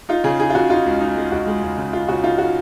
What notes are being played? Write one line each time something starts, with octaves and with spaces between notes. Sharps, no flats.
D#4 F4
C#3 G#4
D#4 G#4
F4
C#3 F#4
D#4 F4
C#2
D#4
G#3
C#2 F#4
G#3
C#2
C#3
C#2 F4
C#3 F#4
D#4 F4
F#4